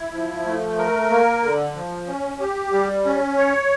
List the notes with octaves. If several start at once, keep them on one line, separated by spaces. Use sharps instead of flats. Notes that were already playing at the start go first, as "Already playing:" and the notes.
Already playing: E4
F3
A3
A#4
A#3
D3
F3
C#4
G4
G3
C#4
C#5